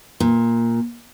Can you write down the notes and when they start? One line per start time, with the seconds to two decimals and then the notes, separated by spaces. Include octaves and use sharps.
0.20 A#2